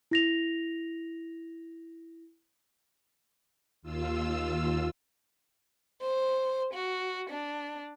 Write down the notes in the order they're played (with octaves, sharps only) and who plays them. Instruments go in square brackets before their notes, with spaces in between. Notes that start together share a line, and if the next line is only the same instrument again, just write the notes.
[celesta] E4 A#6 F7
[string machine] D#2 F4 E6
[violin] C5
F#4
D4